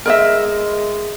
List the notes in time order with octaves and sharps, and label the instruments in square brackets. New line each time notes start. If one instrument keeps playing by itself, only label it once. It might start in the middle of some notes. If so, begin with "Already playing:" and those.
[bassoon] G#3 [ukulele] A#4 D#5 E5